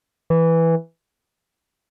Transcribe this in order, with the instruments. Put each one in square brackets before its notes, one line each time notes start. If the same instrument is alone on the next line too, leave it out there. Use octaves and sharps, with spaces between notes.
[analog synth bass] E3